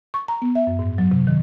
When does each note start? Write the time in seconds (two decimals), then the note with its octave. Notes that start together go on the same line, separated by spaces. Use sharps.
0.14 C#6
0.28 A#5
0.42 B3
0.55 E5
0.67 F#2
0.79 G#2
0.98 F#3
1.12 C3
1.27 D#3